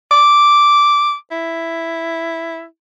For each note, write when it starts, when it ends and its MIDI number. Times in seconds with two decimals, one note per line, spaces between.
0.11 1.14 86
1.31 2.64 64